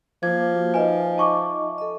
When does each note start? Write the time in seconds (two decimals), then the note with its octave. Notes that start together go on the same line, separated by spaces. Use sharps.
0.23 F3 A#3 D6 G#6
0.54 F#4
0.74 D#4 B4 D#5 E5 G#5
1.18 A5 C#6 D6
1.78 A4 D#5